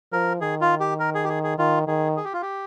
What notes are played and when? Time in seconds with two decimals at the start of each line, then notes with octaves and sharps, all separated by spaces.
0.13 F3 A#4
0.41 D#3 G#4
0.61 F4
0.80 G4
1.00 A#4
1.15 G#4
1.24 G4
1.29 G#4
1.44 G#4
1.58 D#3 F4
1.87 D#3 G#4
2.17 G#4
2.25 G4
2.33 F4
2.42 G4